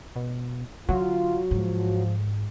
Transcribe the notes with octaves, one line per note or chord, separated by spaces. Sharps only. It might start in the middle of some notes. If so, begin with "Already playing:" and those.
B2
D3 F#3 F4
G#2 F3